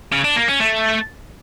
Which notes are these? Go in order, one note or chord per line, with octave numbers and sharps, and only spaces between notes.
C#3
D4
A#3
C#4
A3